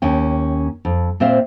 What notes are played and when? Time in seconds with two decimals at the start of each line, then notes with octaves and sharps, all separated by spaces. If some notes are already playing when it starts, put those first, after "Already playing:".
0.02 D#2 C#4 G5
0.85 F2
1.20 A#2 C4 C5 E5 F5